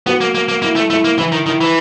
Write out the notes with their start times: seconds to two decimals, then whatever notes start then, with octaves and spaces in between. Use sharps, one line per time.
0.06 B3 F#4
0.21 A#3
0.35 A#3
0.49 A#3
0.62 A#3 E4
0.76 A3
0.90 A3 E4
1.04 A#3
1.18 E3 E4
1.32 D#3
1.46 D#3 E4
1.61 E3